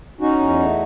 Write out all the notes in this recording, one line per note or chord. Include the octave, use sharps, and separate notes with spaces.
C#4 D#4 F#4
E2
A3